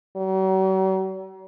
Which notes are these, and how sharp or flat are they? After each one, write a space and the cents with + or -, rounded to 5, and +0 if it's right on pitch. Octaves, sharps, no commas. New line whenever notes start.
F#3 +45